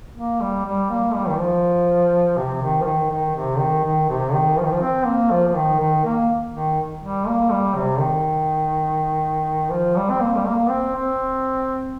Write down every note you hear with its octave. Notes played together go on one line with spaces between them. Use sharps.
A#3
G3
G3
A#3
G3
D#3
F3
C3
D#3
F3
D#3
D#3
C3
D#3
D#3
C3
D#3
F3
D#3
F3
C4
A#3
F3
F3
D#3
D#3
A#3
D#3
G3
A#3
G3
C3
D#3
F3
G3
C4
A#3
G3
A#3
C4
C4